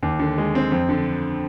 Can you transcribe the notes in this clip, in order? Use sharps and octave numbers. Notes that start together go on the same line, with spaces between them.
D#2
D3
G#3
C4
F2
D3